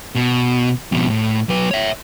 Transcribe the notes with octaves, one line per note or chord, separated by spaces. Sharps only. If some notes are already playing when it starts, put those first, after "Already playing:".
B2
F2 B2
A2
F#3 B4
C#5 E5